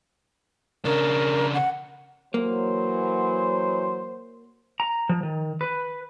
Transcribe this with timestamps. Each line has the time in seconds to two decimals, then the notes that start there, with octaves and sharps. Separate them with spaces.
0.85 C#3 D4 A#4
1.54 F#5
2.34 E3 F#3 A#3 C5
4.80 A#5
5.09 F3
5.23 D#3
5.61 B4